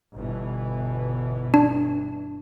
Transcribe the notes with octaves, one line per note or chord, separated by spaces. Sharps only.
G1 B2 E3
D4